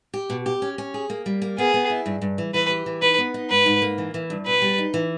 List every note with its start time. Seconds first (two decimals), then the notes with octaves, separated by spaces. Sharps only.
0.14 G4
0.30 B2
0.46 G4
0.62 C#4
0.78 C#4
0.94 G#4
1.10 A#3
1.26 G3
1.42 A#3
1.58 B3 G#4
1.74 B3
1.90 E4
2.06 G2
2.22 G2
2.38 E3
2.54 E3 B4
2.69 G4
2.86 E3
3.02 D#4 B4
3.18 B3
3.34 D#4
3.50 G#2 B4
3.66 G#2
3.82 A#3
3.98 E3
4.14 E3
4.30 G2
4.46 B2 B4
4.62 G3
4.78 D#4
4.94 E3